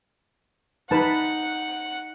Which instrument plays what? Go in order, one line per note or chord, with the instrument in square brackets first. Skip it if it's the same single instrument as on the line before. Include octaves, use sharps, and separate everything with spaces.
[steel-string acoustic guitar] D#4 [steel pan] B4 A5 [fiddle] F#5